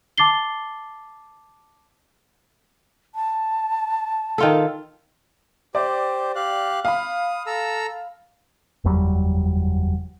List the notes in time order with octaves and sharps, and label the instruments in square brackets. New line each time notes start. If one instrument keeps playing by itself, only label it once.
[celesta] A5 D6 A6 C7 G7
[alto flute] A5
[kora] D#3 F4 A4
[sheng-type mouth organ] G4 C5 [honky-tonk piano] D5 D6
[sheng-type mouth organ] G4 F5 F#6
[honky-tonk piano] F5 B5 [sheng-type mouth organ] D#6
[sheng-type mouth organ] A4 A#5 E6
[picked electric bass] F#1 E2 F#3 G3